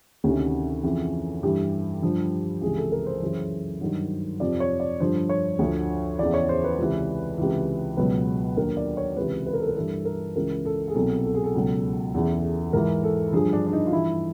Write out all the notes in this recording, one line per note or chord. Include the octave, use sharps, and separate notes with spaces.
D2 C3 D#3 C#4
F2 C#3 E3
G2 E3 G4
G2 D3 F3
C#2 C3 E3 G#4
A4
A#4
C5
F#2 C#3 E3
G2 D#3 F#3
F2 C3 F3 D5
C#5
D5
G2 D3 F3 C5
C#5
D2 D3 F3
E2 C#3 E3 D5
C#5
C5
B4
C#2 C3 E3
C#2 C3 E3
C#2 B2 F#3 B4
D#2 D3 F#3 A#4
D5
C#5
C#2 C3 E3 B4
B4
A#4
A4
A#4
G2 E3 A4
A#4
C#2 C#3 E3 A#4
A4
G#4
C2 B2 F#3 A4
A4
G#4
A4
C#2 B2 F#3
E2 C#3 E3
G#2 E3 A#4
A4
G2 D3 F3 G#4
D4
D4
D#4
F4
G2 E3 E4